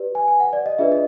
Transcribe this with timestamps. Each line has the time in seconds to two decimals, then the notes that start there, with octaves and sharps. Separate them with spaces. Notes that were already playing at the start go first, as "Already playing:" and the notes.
Already playing: G4 B4 D5
0.15 G#5
0.28 G#5
0.40 F#5
0.53 D5
0.66 D#5
0.78 D4 F4 G#4 B4 D5 E5
0.92 D#5